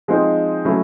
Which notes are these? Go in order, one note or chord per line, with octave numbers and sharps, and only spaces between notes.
F3 G#3 C4 D#4
F#3 A3 C#4 E4